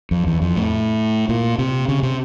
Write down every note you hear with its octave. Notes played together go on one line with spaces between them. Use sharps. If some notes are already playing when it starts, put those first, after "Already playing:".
F2
E2
F2
A2
A#2
C3
C#3
C3